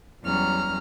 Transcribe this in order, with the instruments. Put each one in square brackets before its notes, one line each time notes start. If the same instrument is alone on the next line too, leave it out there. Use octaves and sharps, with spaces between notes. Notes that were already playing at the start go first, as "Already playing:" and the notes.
[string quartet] E2 F#3 G3 C#4 A#5 F6